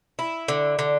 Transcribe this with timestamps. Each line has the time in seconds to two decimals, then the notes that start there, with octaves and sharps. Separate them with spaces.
0.19 E4
0.48 D3
0.79 D3